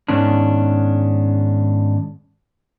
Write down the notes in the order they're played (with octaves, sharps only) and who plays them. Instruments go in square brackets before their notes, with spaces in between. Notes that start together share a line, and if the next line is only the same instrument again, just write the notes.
[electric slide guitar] G#2 D#3 B3 C#4 D4